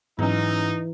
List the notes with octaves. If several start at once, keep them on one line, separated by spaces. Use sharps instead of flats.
G#2 E3 F#3 C#4 D#4